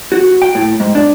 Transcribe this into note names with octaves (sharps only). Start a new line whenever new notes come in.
F#4
G5
A2
G#2
D4